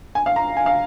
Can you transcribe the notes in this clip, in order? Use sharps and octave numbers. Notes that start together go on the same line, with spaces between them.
G#5
F5
A#5
G#5
F5